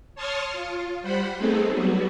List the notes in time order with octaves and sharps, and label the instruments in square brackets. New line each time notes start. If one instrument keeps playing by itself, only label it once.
[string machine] C#5 A5 C6 C#6 D#6 F6
F4
G3 C5 F#5 B5
A3 B3 C4 D#4 G#4 A4
F#3 G3 B3 F#4